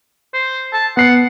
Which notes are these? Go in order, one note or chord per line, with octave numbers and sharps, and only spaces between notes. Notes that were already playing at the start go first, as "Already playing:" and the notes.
C5
A5
B3 F#5 C7 C#7